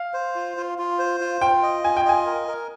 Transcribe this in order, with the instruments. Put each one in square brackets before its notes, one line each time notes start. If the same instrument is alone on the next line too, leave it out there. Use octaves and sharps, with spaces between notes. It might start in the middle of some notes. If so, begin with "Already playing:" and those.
Already playing: [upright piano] F5
[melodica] C5
F4
F4
F4
C5
F4
[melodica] F4 [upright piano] G5
[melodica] D#5
[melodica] F4 [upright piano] G#5
[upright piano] G5
[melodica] D#5 [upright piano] G#5
[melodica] A#4
A#4